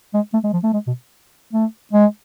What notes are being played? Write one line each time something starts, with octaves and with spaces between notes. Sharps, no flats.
G#3
A3
G#3
F3
A3
G#3
B2
A3
G#3